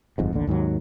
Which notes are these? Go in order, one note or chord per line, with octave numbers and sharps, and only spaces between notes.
G1 F2 G#2
A1 D#2 D3
D#2 G#2 D#3 F#3